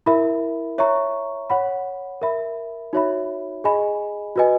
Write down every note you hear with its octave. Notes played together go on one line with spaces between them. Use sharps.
E4 A#4 E5 B5
C#5 E5 A#5 C#6
C#5 F#5 B5
A#4 E5 B5
D#4 F#4 C#5 E5 B5
G#4 D#5 G#5 B5
F#4 B4 D#5 G#5